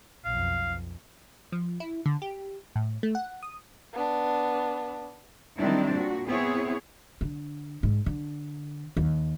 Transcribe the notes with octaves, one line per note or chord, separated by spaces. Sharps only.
B1 F2 F5
F3
E4
D3
G4
A2
A3
F#5
D#6
B3 D4
D#3 F#3 G3 C4 D4 E4
A#2 F#4
B3 C4 E4 G#4 C#5
D3
G#2
D3
D#2